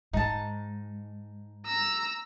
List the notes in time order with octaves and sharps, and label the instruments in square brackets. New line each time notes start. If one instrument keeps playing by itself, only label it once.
[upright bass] G#2 [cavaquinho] D#4 A5
[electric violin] A#5 E6